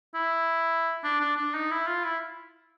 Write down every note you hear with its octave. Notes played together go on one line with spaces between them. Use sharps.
E4
D4
D4
D4
D#4
E4
F4
E4